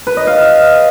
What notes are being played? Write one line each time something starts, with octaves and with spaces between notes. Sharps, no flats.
B4
D#5
F5